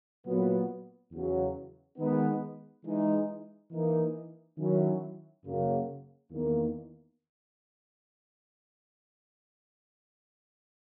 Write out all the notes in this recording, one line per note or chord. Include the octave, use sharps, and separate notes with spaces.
A#2 F#3 B3
E2 C#3 F#3
D#3 G#3 B3 D#4
E3 G#3 D#4
E3 A#3 D#4
D#3 F#3 C#4 E4
F#2 C#3 F#3 A#3
E2 D#3 A#3